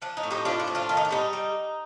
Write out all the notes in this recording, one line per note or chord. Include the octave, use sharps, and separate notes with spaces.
F3 D4
D#4
A2
D#4 G4
F3 D4 F4
D4
A2
D4 F4
D#3 F4
D#4
D4
G3 D#4
G3